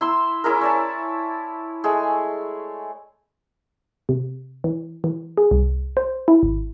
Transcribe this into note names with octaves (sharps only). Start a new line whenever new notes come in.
E4 C6 E6
C#4 E4 G#4 A#4
C#5 D5 A5
G#3 A3 G#4
C3
E3
E3
G#4
C2
C5
E4
G#1